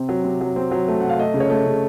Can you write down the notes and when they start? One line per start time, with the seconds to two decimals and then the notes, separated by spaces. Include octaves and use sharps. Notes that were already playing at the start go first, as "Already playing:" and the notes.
Already playing: C3 C4
0.09 F#3
0.24 C3
0.41 F#3
0.56 C4
0.71 F#3
0.88 A3
1.01 C3 F#5
1.10 F5
1.18 A3 D#5
1.34 C#3
1.40 C#5
1.50 A3
1.66 C#3